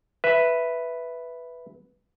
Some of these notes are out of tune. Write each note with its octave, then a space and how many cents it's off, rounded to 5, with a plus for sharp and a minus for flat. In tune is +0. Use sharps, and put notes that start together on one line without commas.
B4 +0 E5 +0